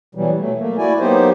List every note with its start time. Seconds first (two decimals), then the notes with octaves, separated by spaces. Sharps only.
0.15 B2 E3 F#3 G3
0.38 F#3 A3
0.58 A3 A#3
0.78 E4 F#4 D5 G#5
1.00 F#3 A#3 B3 D#4 G4 C5